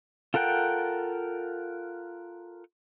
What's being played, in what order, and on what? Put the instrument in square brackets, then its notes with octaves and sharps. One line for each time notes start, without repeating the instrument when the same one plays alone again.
[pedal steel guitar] F4 A4 A#4 F#5 G5